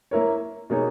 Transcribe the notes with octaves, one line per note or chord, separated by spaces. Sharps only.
A#3 E4 A#4 C#5
B2 A#3 D#4 G#4 C#5